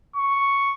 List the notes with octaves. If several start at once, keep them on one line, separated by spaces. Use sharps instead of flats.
C#6